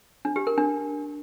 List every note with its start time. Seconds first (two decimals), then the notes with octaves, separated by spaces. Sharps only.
0.25 D4
0.36 G4
0.47 A#4
0.58 D4